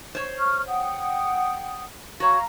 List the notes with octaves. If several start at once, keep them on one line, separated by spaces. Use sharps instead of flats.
C5 C#5
C#6 F6
F#5 G5 D#6
F#4 C#5 F5 A#5